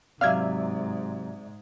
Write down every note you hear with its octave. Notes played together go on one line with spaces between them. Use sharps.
G#2 C3 F#3 D5 E5 F5 F6 G#6